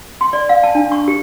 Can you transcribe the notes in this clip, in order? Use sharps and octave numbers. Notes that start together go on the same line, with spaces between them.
C6
D5
F5
A5
D4
C#6
G4